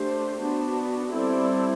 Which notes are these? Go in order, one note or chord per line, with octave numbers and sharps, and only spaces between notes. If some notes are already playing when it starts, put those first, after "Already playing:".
Already playing: A3 D4 G4 C5
B3 D4 F#4
G3 C4 E4 A4 D5